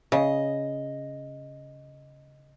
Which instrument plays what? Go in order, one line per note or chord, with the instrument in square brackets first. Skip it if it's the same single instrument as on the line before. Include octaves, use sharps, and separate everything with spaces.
[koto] C#3 [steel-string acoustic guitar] D#5